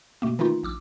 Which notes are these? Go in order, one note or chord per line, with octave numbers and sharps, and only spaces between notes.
B2 A3 A#3
D#3 E3 A3 D#4 F4
A#1 D6 E6